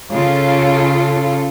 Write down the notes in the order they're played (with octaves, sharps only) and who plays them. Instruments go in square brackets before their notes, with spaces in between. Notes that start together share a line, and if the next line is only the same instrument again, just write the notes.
[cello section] C#3 F4 A4